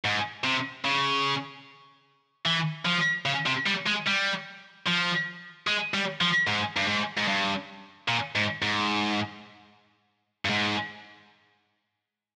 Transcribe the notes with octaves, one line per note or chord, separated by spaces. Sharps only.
G#2
C3
C#3
E3
F3
C#3
C3
G3
G#3
G3
F3
G#3
G3
F3
G#2
G2
G#2
G#2
G2
A#2
G#2
G#2
G2
G#2